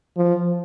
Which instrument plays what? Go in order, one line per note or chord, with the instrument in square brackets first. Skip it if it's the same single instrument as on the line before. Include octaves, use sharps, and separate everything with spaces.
[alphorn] F3